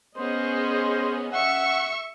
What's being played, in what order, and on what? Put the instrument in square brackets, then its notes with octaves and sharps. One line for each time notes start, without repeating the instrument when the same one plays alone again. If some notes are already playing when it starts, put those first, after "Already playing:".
[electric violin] B3 [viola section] C#4 G#4 D#5 [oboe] C5
[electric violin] E5 C#6 [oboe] F#5